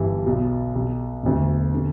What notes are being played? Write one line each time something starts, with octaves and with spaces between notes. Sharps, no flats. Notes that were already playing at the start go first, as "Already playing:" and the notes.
Already playing: G1 G2 E3 G3
B1 B2
B1 B2
E1 D2 D3
D3